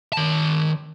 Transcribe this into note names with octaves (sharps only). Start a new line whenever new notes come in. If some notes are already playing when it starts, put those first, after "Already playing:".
D#3 A5